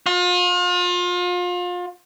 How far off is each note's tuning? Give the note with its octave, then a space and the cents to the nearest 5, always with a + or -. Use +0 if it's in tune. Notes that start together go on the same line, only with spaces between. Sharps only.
F4 +35